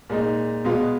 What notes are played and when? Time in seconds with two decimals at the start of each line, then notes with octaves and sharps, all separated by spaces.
0.09 A#2 G#3 D#4
0.64 B2 G#3 B3 F4